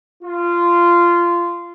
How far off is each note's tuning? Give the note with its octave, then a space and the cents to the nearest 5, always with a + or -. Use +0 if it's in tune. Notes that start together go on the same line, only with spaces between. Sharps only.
F4 -15